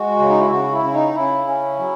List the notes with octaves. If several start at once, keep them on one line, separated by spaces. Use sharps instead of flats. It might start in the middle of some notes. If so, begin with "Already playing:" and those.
Already playing: G#3 F#4
C#3
D#4
E4
C#3 F#4
E4
C#3
D#4
C#3 E4
C#4
F#3